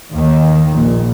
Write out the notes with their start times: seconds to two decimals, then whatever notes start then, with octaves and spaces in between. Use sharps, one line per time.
0.13 D#2 D#3
0.72 A#1 A#2